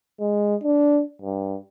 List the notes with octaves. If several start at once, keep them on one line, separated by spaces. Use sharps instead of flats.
G#3
D4
G2